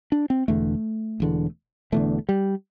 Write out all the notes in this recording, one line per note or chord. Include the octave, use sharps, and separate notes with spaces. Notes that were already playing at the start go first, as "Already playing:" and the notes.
D4
C4
E1 E2 D3 A3
E1 E2 D3
E1 E2 D3 A3
G3